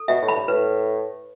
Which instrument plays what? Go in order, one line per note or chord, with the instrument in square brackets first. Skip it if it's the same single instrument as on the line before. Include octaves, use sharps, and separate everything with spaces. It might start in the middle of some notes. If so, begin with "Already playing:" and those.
Already playing: [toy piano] A4
[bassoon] B2 [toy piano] E5
[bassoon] A2
[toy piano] B5
[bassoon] G2
[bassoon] A2 [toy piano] B4